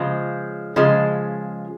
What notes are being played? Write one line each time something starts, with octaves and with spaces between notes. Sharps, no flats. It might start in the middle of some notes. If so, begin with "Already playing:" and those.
Already playing: C#3 F3 G#3
C#3 F3 G#3